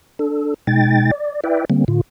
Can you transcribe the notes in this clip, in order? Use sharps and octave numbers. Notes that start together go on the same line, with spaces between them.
D4 A4
B2 G#3 D#4 G5 A6
D5
E4 B4 D5 E5 G5
D3 G3 A#3 C4
A2 D3 F4